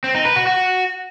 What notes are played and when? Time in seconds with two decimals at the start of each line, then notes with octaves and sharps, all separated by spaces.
0.04 C4
0.15 D#4
0.25 B4
0.36 F#4
0.47 F#4